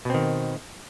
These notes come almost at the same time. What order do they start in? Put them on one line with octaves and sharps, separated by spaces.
B2 C4 D#3